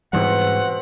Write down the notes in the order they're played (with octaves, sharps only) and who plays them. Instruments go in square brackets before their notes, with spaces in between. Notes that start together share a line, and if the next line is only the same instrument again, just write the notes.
[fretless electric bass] G#2 E3 G3 [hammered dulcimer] B2 C4 A#5 [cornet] F#5